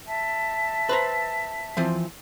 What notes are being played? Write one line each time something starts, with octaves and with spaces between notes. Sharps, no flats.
E5 A5
B4 C5 A#5
E3 F3 C4